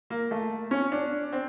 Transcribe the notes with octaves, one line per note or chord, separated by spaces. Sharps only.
A#3
A3
C#4
D4
C4